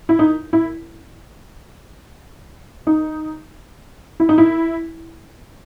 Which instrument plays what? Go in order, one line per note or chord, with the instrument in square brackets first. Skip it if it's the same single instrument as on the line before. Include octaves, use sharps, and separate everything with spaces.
[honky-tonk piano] E4
D#4
E4
D#4
E4
D#4
E4